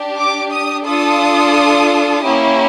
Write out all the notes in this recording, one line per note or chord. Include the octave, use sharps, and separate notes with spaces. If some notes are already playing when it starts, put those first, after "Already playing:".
Already playing: D4 G4
D6
D#6
D4 F4 A4 D#6
A#3 C#4 E4 G4